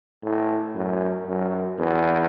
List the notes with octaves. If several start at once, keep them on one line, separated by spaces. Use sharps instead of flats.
A2
F#2
F#2
E2